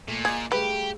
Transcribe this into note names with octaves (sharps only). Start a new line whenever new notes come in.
A#2 A3
F4 G#4 D5 D#5
C#3 G3 A3 G4 B4